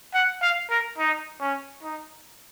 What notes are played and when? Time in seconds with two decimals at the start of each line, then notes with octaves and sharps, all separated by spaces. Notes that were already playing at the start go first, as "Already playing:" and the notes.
0.14 F#5
0.42 F5
0.70 A#4
0.98 D#4
1.40 C#4
1.83 D#4